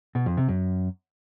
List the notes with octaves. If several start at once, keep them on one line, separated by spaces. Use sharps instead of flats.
B2
F2
C3
F#2